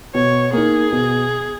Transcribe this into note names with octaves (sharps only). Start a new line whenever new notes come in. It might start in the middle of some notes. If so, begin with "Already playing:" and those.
B2 C#5
A#3 D#4 G#4
B2